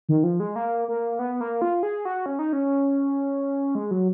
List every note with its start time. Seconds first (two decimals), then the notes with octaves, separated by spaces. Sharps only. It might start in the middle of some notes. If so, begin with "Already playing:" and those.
0.09 D#3
0.24 F3
0.40 G#3
0.56 A#3
0.88 A#3
1.19 B3
1.41 A#3
1.62 F4
1.83 G#4
2.05 F#4
2.26 C#4
2.39 D#4
2.53 C#4
3.75 G#3
3.91 F#3